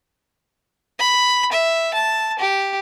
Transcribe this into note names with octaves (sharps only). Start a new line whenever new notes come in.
B5
E5
A5
G4